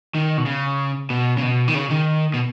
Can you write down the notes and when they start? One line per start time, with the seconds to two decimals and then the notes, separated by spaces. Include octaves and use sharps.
0.15 D#3
0.37 B2
0.46 C#3
1.10 B2
1.37 C#3
1.42 B2
1.68 D#3
1.75 C#3
1.90 D#3
2.34 B2